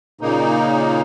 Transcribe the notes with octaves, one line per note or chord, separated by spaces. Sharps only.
A#2 C#3 A#3 D#4